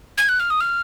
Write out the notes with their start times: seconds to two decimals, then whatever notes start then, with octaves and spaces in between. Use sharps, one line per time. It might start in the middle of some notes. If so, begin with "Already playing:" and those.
0.18 G#6
0.29 F#6
0.40 F6
0.50 D#6
0.61 F6